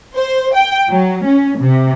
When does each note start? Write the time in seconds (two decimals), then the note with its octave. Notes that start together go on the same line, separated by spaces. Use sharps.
0.15 C5
0.55 G5
0.90 F#3
1.26 C#4
1.61 C3